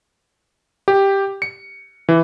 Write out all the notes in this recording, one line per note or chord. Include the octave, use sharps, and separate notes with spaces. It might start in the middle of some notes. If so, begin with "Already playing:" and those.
G4
C#7
E3